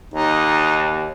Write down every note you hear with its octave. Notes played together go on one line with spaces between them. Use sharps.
D#2 D#4